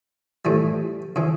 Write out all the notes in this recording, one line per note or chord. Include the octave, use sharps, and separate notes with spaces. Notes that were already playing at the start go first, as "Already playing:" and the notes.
A2 E3 G3
C#3 E3